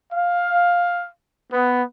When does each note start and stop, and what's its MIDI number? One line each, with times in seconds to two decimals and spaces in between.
0.13 1.08 77
1.51 1.83 59